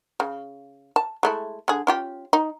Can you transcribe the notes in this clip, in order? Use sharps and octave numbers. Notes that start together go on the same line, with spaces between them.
C#3
A5
G#3 A3 E4
D3 G#4
C#4 F4 G4
D#4